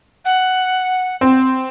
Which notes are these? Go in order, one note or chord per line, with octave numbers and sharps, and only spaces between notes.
F#5
C4